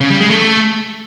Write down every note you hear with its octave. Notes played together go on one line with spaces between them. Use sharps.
C#3
G3
G#3
A3